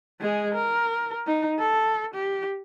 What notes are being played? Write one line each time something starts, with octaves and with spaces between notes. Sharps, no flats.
G#3 G#4
A#4
D#4
A4
G4